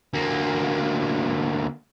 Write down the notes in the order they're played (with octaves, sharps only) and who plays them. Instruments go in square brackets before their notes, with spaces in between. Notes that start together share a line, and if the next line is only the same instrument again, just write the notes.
[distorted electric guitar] D2 A#3